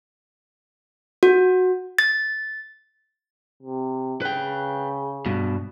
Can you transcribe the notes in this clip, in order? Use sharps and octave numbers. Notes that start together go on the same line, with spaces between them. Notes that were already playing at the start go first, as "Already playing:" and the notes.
F#4
A6
C3
C#3 B4 G5
G2 B2